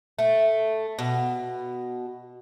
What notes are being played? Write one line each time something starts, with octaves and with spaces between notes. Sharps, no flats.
A3
B2